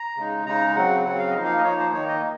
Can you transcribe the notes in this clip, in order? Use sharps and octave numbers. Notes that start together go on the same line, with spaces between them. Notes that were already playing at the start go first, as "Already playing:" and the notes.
Already playing: A#5
C#3 G#3 D#4
C#3 G#3 D#4 A#5
C#3 F#3 C4 F#5
C#3 F#3 C4 F#5
F5
F3 A#3 D#4 D#5
F5
D#5
F3 A#3 D#4 C#5
C5
D#3 A#3 D#4 C#5
D#5